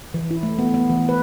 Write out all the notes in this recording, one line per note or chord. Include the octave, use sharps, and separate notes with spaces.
E3
E4
A3
B3
B3
E3
B4